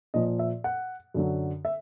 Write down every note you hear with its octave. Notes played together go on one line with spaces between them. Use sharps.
A#2 F3 D#5
E5
F#5
F#2 D3 F#3
E5